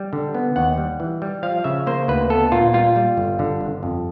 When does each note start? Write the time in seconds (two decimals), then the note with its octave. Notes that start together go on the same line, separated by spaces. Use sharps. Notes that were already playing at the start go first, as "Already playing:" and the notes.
Already playing: G3
0.13 D3
0.35 B3
0.56 D#2 F#5
0.78 G3
1.00 E3
1.22 G3
1.43 F3 F5
1.64 C#3 E5
1.87 A#3 C5
2.08 D2 B4
2.30 B3 A4
2.52 A#2 F4
2.73 G3 F4
2.96 G3
3.17 G1
3.39 D3
3.61 G1
3.83 F2